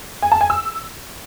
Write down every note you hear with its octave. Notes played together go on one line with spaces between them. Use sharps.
G#5
A5
G#5
E6